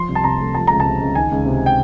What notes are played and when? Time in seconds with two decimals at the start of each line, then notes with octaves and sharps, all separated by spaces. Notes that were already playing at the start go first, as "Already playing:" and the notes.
Already playing: F3 C6
0.09 C2
0.15 A5
0.24 C3 A#5
0.40 A3
0.55 F3 A5
0.67 C#2 A#5
0.80 A5
0.85 C3
1.00 C#2
1.15 D#3 G#5
1.31 C#2
1.46 C3
1.66 G5